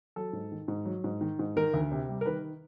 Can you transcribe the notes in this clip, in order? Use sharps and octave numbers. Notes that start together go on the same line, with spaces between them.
F#3 A4
G#2
D#3
G#2
F#3
G#2
D#3
G#2
D#3 A#4
D2
C3
G3
A#4
D#3 B4